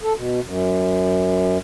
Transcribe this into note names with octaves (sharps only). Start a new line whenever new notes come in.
A4
B2
F#2